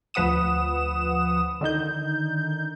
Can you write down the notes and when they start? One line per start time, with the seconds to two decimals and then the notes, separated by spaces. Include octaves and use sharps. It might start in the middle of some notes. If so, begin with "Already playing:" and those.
0.14 D2 F3 B4 F#5 D#6 E7
1.61 D3 D#3 D#4 G6